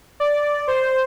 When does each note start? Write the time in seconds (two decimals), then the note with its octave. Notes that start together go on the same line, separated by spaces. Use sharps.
0.20 D5
0.68 C5